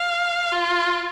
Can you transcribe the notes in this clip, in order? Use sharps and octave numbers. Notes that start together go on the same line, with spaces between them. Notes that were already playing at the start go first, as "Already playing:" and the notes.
Already playing: F5
F4